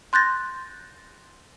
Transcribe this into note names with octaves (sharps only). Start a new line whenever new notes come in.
C6 F#6 G6 A6 A#6